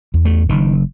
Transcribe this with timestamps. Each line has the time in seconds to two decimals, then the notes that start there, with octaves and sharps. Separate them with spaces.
0.14 E2
0.25 A3
0.49 F#1 D#3